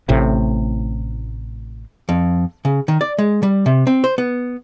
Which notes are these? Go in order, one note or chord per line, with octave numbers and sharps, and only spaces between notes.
A1 A2 C3
F2
C#3
D#3
D5
G#3
G3
C3
C4
C5
B3